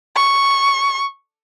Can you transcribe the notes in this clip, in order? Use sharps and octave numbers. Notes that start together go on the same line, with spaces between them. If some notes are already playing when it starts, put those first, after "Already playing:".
C#6